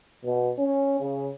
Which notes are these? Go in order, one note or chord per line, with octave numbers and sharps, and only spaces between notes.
B2
C#4
C#3